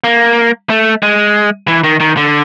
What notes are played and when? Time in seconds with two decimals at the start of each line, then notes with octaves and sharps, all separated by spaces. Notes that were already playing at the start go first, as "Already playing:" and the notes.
0.04 A#3
0.70 A3
1.03 G#3
1.68 E3
1.84 D#3
2.00 D#3
2.17 D3